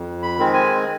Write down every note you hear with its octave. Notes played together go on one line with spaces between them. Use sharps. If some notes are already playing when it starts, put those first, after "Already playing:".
Already playing: F2
B5
D#3 G#3 C4
G#5